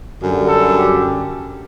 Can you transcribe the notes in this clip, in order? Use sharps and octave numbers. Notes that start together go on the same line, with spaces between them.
F#2 D3 G3
A4
G4